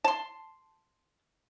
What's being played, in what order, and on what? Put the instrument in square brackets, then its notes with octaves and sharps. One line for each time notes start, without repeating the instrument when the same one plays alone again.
[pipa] A5 C6